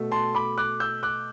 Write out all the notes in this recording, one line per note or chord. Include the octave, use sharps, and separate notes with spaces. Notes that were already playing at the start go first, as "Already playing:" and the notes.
Already playing: B2 A3
A5 C6
B5 D6
D6 F#6
E6 G6
D6 F#6